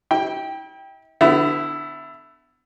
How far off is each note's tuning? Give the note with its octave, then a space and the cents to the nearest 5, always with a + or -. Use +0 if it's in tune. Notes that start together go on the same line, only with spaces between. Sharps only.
E4 -45 G5 +0
D3 +15 B3 +35 E4 +0